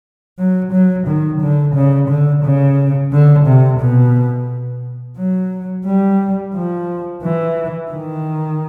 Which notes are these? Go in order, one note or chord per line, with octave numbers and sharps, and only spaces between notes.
F#3
F#3
D#3
D3
C#3
D3
C#3
D3
C3
B2
F#3
G3
F3
E3
D#3